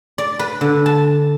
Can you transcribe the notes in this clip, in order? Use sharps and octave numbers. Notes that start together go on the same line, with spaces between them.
D5
B4
D3
A5